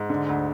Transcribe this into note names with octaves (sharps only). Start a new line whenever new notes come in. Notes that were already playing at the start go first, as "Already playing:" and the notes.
Already playing: G#2
D3
D2